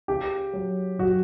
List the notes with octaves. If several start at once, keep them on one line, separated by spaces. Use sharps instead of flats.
C#3 G4
F#3
F#2 F#4